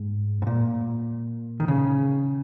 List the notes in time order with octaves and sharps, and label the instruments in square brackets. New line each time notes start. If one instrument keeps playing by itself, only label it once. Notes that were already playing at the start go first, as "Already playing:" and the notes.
Already playing: [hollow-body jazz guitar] G#2
G#2
A#2
D#3
C#3